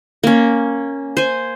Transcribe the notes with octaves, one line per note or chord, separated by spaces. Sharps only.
A#3 C#4
C5 G#5